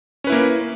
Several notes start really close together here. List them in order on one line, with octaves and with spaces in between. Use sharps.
C#4 B4 E4 A#3